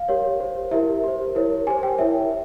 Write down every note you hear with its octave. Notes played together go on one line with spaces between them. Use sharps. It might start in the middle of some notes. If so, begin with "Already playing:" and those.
Already playing: F5
G4 A#4 C#5
G4 C5
E4 G4 A#4 E5
G4 C5
E4 A#4 C#5
G4 C5 G#5
G5
E4 A#4 C#5 E5